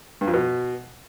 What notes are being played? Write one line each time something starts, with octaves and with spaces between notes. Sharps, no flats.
G2
F2
B2